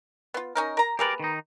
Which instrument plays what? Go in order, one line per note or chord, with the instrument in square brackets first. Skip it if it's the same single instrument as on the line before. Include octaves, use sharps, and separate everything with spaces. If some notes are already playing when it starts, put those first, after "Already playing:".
[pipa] B3 F4
C#4 D#4 A#4
A#4 A#5
[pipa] A#3 G#4 B4 [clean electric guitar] G4 A#4 D5
[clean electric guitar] D#3 D#4